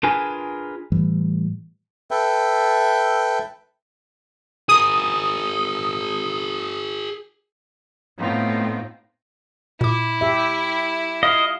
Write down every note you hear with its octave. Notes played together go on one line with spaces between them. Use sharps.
D4 F4 G#4 A#4 B4 G#5
A2 E3 G3
A4 B4 E5 G5
G#4 A#4 D#6
A2 A3 B3 C4 D#4 F4
A#2 E4 D6
G4 E5
D#5 F5